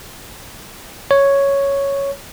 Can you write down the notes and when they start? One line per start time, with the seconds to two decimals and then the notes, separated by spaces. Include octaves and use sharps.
1.11 C#5